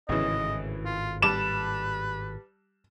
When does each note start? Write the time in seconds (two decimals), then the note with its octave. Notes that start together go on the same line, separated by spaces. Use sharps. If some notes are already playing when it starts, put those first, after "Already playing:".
0.09 G#1 A2 C#3 E3 D#5
0.85 F4
1.22 G3 B4 A5 D6 E7